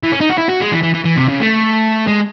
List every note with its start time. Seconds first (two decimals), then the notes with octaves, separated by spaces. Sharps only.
0.03 E3
0.12 C#4
0.21 D#4
0.29 F#4
0.38 E4
0.49 F#4
0.61 G#3
0.72 E3
0.83 E3
0.95 E3
1.05 E3
1.17 C3
1.28 C#3
1.40 A3
2.08 G#3